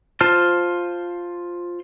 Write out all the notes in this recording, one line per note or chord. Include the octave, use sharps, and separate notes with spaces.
F4 C5 A5 F6